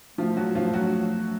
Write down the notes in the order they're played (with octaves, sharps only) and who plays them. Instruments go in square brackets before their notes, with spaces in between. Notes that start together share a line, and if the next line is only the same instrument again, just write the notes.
[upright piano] F3 F4 [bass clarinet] A3
[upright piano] F#3 F#4
F3 F4
F#3 F#4